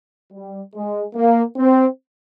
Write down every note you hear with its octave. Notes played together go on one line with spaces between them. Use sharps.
G3
G#3
A#3
C4